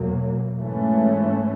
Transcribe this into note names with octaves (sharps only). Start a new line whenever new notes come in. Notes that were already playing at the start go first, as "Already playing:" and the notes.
Already playing: E2 B2 F#3 A#3
G#2 E3 A3 C#4